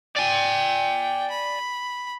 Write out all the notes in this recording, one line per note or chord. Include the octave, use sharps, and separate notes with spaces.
D5 G5 G#5
B5